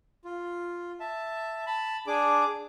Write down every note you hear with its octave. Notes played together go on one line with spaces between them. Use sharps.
F4
E5 A5
A5 B5
D4 G#4 D6